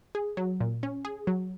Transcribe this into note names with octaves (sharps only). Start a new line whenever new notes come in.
G#4
F#3
A#2
C#4
G#4
F#3